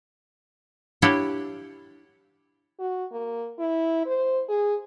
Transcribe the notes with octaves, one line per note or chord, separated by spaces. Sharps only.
D4 E4 G4 C#5 F5 F#5
F#4
A#3
E4
C5
G#4